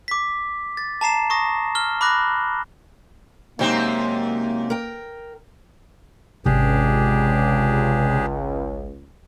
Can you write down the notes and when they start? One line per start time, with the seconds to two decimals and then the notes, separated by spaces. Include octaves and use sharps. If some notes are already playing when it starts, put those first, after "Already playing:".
0.08 D6 B6
0.77 A6
1.01 A5 A#5 C7 E7
1.30 C#6 D#6 A#6
1.75 F6 G7
2.01 B5 D6 F#6 A#6
3.59 F#2 C3 G#3 A#3 C4 D#4 G4
4.70 A#4 G5
6.46 G#1 C#2 C3 G#3 D4 G4 G#4